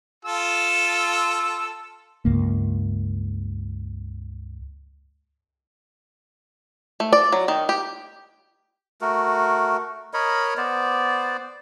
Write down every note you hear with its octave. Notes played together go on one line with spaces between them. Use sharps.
F4 A4 E6
C#2 G2 A#3
A3
D5
F#3
D#3
G4
A3 F#4 A#4
A#4 C#5 D#5 B5
B3 C5 D5